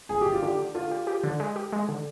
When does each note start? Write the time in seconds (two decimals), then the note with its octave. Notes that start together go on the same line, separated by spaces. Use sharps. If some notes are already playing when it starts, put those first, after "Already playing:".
0.09 G1 G#4
0.21 G1 G4
0.32 F4
0.42 D3 G4
0.59 D3
0.75 D3 F4
0.91 G4
1.07 G4
1.24 D3
1.40 G#3
1.56 G4
1.73 G#3
1.89 D3